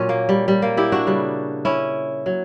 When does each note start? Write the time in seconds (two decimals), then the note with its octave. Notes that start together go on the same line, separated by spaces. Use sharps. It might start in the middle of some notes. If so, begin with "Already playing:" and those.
Already playing: A#2 F#3 C#4
0.09 A#3
0.29 G3
0.48 G3
0.62 A#3
0.77 E4 G4
0.92 D4 F#4
1.07 C#3 G3
1.65 C#4 E4
2.26 F#3